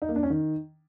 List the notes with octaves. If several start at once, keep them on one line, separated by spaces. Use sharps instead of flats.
D#4
A#3
D4
C#4
D#3